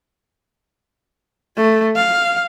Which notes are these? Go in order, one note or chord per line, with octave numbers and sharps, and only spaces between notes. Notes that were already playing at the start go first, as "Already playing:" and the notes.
A3
F5